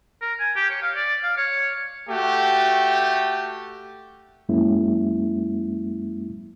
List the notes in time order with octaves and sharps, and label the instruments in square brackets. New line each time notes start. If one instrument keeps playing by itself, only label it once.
[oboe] A#4
G#5
G4
C#5
F5
D5
F5
C#5
[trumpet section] A3 F#4 G4
[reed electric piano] F#2 F#3 G#3 A#3 C#4 E4